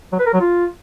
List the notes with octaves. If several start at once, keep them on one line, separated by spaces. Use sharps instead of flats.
F#3
B4
A#4
F#3
F4